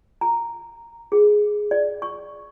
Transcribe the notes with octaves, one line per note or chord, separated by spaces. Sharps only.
A#5
G#4
D5
C#6